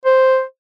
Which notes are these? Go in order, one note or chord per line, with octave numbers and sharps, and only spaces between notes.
C5